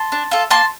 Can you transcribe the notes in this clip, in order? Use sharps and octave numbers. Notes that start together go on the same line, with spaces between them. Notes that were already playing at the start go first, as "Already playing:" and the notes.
Already playing: A5 C6
D4
F4 A4
A#3 A5 C6